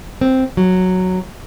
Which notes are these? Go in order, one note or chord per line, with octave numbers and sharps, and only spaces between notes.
C4
F#3